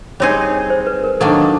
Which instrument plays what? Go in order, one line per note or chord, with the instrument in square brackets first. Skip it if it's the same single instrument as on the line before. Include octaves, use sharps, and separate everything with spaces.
[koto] G3 C4 D#4 G#4 [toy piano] C#5
[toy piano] C5
B4
A#4
[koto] D#3 F#3 A#3 D4 [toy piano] A4